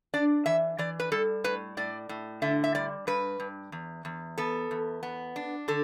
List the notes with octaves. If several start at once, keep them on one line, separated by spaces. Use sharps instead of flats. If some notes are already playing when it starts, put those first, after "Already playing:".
D4 D5
E3 E5
E3 D5
B4
G3 A4
A2 B4
A2 D5
A2
D3 E5
E5
G3 D5
G2 B4
G2
E2
E2
B3 A4
E2
B3
D4
D3 A4